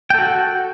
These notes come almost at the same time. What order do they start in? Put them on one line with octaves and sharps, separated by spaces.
G5 A4 F#4